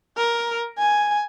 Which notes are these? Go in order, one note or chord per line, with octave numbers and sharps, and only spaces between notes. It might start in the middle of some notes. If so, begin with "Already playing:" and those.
A#4
G#5